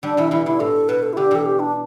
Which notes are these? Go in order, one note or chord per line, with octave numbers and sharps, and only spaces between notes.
D3 G3 D4
B2 E3 E4
B2 E3 E4
D3 E4
A2 A4
B2 B4
A4
E4
D3 G4
B2 E3 A4
G4
D4